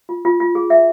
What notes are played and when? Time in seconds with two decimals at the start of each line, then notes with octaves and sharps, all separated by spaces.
0.09 F4
0.25 F4
0.40 F4
0.55 G#4
0.70 E5